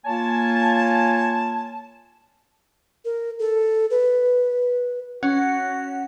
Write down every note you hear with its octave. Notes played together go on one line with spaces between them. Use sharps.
A#3 F4 C#5 G#5 A5
A#4
A4
B4
C#4 F#4 F#5